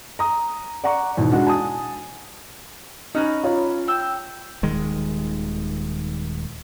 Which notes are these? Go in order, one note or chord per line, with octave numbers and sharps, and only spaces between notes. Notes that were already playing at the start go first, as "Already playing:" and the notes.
A#5 D#6
D5 F#5 A#5 C#6
E2 G#2 B2 D#3
G#3 D4 F#4
G#5 A5 D#6
C#4 D#4 B4 A#5
F4 C#5
G5 E6
D#1 D#3 G#3